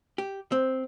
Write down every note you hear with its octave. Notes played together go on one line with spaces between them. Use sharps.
G4
C4